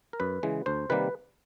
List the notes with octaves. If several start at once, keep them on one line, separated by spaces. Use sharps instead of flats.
A#4
F#2 B4
C#3 E3 G#3
D2 C5
C3 D#3 G3 A#3 B4